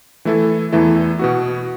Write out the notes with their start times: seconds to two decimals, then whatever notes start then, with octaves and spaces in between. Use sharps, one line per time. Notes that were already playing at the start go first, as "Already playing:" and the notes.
0.25 E3 A3 E4 A4
0.72 E2 E3 A3 E4 A4
1.19 B2 B3 F#4